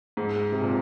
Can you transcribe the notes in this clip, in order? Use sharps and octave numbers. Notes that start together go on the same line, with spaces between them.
G#2 G#3
C3
A#2 C4